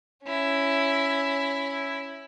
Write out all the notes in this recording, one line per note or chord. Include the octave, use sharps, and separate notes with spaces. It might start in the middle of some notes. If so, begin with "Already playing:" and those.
C#4 E4